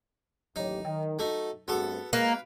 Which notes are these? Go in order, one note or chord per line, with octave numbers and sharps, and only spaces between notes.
A1 D#2 F#3 D#4 G4 C#5
D#3 G5
A3 D#4 F#4
G2 A3 B3 C4 F#4 G#4 A4
G#3 A#3 B4 F5